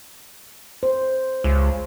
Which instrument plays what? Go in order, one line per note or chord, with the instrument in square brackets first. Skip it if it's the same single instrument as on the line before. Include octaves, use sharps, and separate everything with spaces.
[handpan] C5
[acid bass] C#2